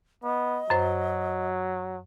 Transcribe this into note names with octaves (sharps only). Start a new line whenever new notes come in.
B3 D#5
F#2 F#3 C5